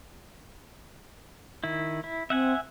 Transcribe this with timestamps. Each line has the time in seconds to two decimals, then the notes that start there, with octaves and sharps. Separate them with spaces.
1.64 D#3 E4
2.04 E4
2.30 C4 E5 F#5 G#5